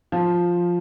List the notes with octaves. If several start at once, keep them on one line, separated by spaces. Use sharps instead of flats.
F3